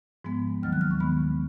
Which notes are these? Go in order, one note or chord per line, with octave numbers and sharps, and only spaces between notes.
G#2 F3 G#3 B3
D#2 D#3 F#3 A#3 F6
F#6
F6
C#6
D#3 G#3 B3 B5